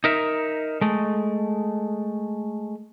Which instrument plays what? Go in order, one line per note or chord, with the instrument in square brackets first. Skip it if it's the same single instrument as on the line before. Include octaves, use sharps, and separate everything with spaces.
[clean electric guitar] D#4 A#4 E5
G#3 A3